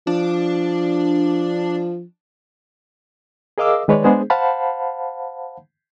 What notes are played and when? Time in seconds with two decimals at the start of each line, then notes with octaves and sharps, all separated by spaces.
0.07 F3 D4
3.58 G#4 A#4 D#5 F5 D6 E6
3.88 D#3 G#3 B4 C#5 D5
4.04 G#3 B3 D4 G#4 C5
4.30 C5 F5 F#5 A5 B5